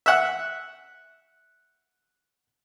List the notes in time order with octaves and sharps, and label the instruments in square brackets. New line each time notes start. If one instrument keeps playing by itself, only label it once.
[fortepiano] E5 F#5